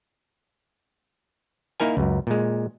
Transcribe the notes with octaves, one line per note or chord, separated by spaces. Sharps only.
A#3 D#4 E4 A#4 G#5
C#2 F#2
A#2 G#3